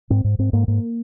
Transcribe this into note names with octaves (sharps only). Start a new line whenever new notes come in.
G#2 C4
G#2
G#2 C4
G#2 A#3
G#2 A#3